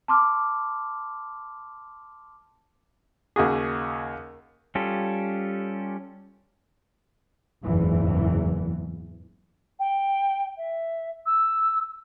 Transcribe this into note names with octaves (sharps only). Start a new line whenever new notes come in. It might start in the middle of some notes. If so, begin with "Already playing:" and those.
A5 C6 D6 F6
D#2 C#3 F#4 G#4
G3 C#4 F4 G4 A4
F#1 E2 G#2 E3
G5
E5
E6